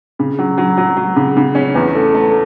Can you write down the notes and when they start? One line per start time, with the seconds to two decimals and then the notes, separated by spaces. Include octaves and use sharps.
0.19 C#3
0.39 F#3
0.58 F#3
0.77 F#3
0.97 F#3
1.16 C#3
1.37 C#3
1.55 C#4
1.75 E2
1.95 A3
2.14 A3